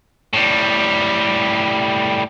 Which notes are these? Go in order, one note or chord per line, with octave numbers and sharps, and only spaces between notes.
A2 G3